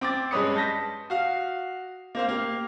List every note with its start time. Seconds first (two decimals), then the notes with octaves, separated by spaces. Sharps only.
0.01 C4 D6 A6
0.31 G2 G#3 C#4 B4 D#6 C#7
0.55 A5 G6 A#6 B6
1.10 F#4 F5
2.15 A#3 C5 F5
2.28 A#3 G4 F5